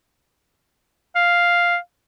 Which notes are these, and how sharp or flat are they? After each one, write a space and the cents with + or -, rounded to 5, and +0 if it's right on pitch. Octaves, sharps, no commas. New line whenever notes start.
F5 +0